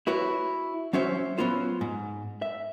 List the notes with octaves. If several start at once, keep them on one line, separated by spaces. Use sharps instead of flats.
E4 F#4 B4 C#5
F#3 C#4 C5 C#5 E5
F#3 B3 C#4 F4 C5
G#2
E5